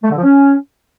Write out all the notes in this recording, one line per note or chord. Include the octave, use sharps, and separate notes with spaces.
A3
D3
F3
C#4